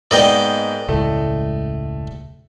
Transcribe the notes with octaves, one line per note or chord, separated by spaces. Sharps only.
G#2 A#3 B3 D5 D#5 G5
E1 C#2 A2 A3